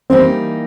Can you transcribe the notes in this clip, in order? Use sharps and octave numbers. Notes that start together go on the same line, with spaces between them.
E3 G3 A#3 C4 D#4 G4